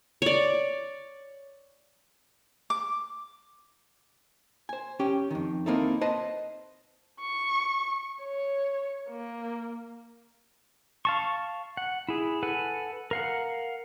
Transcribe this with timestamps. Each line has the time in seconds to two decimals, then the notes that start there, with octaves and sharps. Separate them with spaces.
0.22 C#5 D5
2.70 D6
4.69 C5 G#5
5.00 C#4 G4 G5
5.31 F2 D#3
5.66 A#3 C4 D#4 E4 A4
6.01 B4 C5 D#5 A5
7.20 C#6
8.22 C#5
9.10 A#3
11.05 F5 A5 C#6
11.77 F#5
12.09 E4 G#4
12.43 A4 B4 F#5 G#5
13.11 A#4 F5 F#5